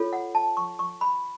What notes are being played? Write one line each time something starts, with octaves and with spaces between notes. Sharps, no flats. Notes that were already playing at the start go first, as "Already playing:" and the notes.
Already playing: F4 A4 C#5
F#5
A5
C#6
C#6
B5